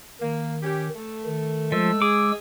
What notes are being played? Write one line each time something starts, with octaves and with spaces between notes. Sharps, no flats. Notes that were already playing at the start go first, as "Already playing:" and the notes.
D#3 A#3
C#4 G4
A3
D#3
F3 G#3 E6
G#4 D6